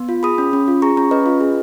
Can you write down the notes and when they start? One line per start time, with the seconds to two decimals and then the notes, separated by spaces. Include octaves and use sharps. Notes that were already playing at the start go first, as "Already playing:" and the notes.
Already playing: B3
0.09 F4
0.23 G#4 B5 D#6
0.38 C#4
0.53 C#4
0.68 F4
0.82 G#4 A#5 C#6
0.97 C#4 A#5 C#6
1.11 C#4 B4 D#5
1.26 F4
1.41 G#4